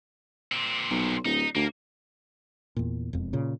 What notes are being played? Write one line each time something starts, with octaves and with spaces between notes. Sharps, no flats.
A#2 C4
B1
D1 D#4
D2 A#3
E2 A#2
E1 F2
A#2 C#3